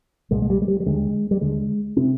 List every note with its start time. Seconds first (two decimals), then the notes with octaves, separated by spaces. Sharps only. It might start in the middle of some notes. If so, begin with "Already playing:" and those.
0.31 C2 A#2 G#3
0.42 G#3
0.50 G3
0.62 G#3
0.68 G3
0.80 G3
0.86 D#2 D3 G#3
1.31 G3
1.41 D#2 D3 G#3
1.97 C3 C4